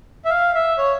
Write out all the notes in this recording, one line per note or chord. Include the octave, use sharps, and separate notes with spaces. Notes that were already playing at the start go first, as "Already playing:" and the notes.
E5
F5
E5
C#5